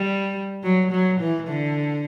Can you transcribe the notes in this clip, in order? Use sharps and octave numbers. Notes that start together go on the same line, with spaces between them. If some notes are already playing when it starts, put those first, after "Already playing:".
Already playing: G3
F#3
F#3
E3
D3